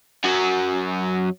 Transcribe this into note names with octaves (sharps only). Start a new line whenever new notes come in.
F#2 F#3